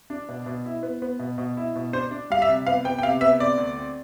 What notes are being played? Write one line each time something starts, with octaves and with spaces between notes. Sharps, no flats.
D4
B2
B2
E4
B3
B3
B2
B2
E4
B2
D4 C5
D4
G3 F5
E5
C3
B3 F5
B3 G5
G5
C3 F5
B3 E5
C4 D5
D2
C4